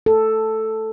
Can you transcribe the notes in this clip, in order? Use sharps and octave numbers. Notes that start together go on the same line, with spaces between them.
A4